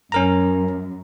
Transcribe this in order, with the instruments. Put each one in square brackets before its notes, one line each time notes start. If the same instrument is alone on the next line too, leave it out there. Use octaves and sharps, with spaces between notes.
[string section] F#2 [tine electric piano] C#4 A#4 A#5